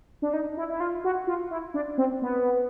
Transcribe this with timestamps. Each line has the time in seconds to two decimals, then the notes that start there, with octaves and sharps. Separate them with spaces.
0.22 D4
0.33 D#4
0.57 E4
0.70 E4
0.80 F4
1.04 F#4
1.27 F4
1.51 E4
1.74 D4
1.98 C4
2.22 B3